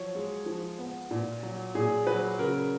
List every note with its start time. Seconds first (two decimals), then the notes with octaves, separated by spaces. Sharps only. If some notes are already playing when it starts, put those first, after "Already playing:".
Already playing: F3 F#3 C#5
0.15 G#3
0.46 F3
0.79 B3
1.11 A#2
1.43 F#3
1.75 A#2 G#4
2.07 F#3 B4
2.39 C#3 A#4